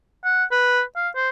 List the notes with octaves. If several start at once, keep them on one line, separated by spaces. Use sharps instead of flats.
F#5
B4
F5
C5